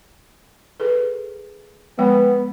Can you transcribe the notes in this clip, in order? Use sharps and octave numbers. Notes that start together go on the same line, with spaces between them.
G#4 A4 B4
F3 G#3 B3 G5